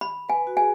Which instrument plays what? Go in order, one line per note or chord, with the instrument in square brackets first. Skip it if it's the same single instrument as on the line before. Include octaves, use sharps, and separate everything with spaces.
[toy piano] B5
[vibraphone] B4 [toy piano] G#5
[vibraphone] F#4
[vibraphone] G#4 [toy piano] G#5